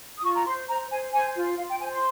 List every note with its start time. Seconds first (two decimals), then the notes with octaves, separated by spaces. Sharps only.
0.18 D#6
0.23 F4 C#6
0.35 A#5
0.45 C5 C6
0.68 C5 A#5
0.90 C5 G#5
1.13 C5 G#5
1.36 F4
1.57 F4 F5
1.69 G5
1.80 C5 G#5
1.92 C6